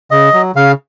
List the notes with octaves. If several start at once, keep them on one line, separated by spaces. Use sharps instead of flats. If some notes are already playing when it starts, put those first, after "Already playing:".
C#3 D#5
F#3
C#3 F5